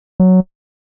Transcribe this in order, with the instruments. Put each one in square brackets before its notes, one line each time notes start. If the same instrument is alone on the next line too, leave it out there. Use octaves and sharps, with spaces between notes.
[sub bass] F#3